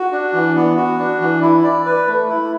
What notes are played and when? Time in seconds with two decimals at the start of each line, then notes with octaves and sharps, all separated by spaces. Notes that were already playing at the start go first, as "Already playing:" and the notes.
Already playing: F#4
0.12 D4
0.33 E3
0.55 B3
0.77 F#4
0.99 D4
1.20 E3
1.42 E4
1.64 D5
1.86 B4
2.07 A3
2.29 E4